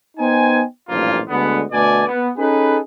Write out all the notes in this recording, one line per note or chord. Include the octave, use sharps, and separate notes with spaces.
B3 D#4 C5 G5 G#5
A1 G2 A#2 F3 A#3 F4
D2 D3 G#3 B3
D2 B2 A3 B4 D5 G#5
B3
C#4 D#4 G#4 A4 B4